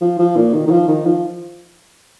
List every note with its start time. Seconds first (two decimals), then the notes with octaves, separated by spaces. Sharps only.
0.01 F3
0.19 F3
0.36 A#2
0.54 D#3
0.67 D#3
0.71 F3
0.88 D#3
1.05 F3